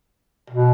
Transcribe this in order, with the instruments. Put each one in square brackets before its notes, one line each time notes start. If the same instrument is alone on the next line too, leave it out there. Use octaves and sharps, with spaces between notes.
[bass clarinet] B2